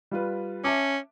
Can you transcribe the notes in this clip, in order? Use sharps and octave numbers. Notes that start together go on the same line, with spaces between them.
G3 F4 B4
C#4 E5 A5 D6